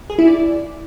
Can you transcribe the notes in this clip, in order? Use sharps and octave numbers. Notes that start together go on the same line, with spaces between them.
G#4
E4
D5